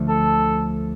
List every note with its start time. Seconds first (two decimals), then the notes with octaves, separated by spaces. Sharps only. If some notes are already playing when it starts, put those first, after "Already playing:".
Already playing: D2 D3 F3 A3
0.09 A4